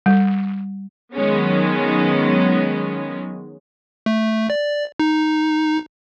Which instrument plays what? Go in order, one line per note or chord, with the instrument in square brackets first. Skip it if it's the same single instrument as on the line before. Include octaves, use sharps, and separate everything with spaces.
[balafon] G3
[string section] D#3 F#3 G#3 B3 C#4
[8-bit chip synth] A3
D5
D#4